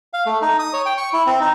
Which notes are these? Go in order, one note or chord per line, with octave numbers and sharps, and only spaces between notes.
F5
A3
D#4
D#6
C#5
G5
C#6
E4
C4
D#4